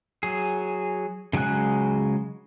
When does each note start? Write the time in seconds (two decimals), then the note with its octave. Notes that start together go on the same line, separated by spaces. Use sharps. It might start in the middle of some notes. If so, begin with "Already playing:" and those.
0.23 F#3 G#4
1.33 C#3 F#3 G#3 G#5 F#6